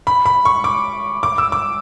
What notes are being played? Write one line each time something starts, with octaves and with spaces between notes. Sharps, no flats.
B5
B5
C#6
D6
D6
E6
D6